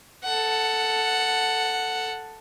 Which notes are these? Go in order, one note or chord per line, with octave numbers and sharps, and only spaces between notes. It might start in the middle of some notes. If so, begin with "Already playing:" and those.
A4 F#5